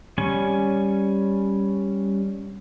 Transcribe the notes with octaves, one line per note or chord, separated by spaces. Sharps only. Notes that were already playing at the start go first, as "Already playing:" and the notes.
G3 C#4 G#5